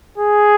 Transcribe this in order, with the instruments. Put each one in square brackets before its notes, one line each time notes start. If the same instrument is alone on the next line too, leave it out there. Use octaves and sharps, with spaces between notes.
[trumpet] G#4